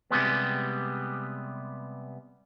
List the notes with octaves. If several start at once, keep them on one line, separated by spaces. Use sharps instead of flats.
C3 G3 G#3 B3